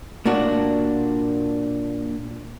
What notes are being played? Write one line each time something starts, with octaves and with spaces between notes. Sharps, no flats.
A#2 A#3 D4 F#4